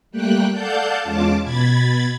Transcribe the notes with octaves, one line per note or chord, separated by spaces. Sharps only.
G3 A3 A#3 G5 F#6
A4 D5 F5 F#5 A5 G6
E2 G#3 C#4 F4 A5 D6
B2 B5 G#6 A6